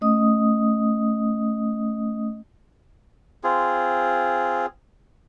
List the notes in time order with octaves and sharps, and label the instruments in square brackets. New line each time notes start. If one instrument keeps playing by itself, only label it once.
[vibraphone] A3 C#4 D#5 D#6
[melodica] C4 F4 G#4